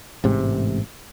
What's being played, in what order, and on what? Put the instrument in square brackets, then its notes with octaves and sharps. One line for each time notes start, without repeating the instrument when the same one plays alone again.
[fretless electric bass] A1 G#2 C3 G#3